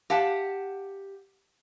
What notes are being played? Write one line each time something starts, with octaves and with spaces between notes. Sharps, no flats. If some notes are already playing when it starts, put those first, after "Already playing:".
G4 F5 F#5 A5